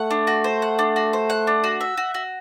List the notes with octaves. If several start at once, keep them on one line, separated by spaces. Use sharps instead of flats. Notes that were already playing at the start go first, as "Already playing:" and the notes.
Already playing: A3 F#5
D4
F#4
C5
F#5
D4
F#4
C5
F#5
D4
F#4
E5
F#4
F#4